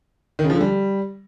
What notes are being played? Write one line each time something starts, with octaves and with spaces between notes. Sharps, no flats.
D#3
C#3
F3
D3
G3